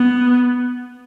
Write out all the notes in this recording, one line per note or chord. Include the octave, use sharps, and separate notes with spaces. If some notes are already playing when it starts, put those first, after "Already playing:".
Already playing: B3